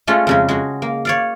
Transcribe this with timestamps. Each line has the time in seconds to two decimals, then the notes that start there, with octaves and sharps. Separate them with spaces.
0.07 G#3 A3 C#4 F4
0.27 F2 C#3 G#3
0.48 G#3 F#4
0.82 A#3
1.05 C#5 D5 F5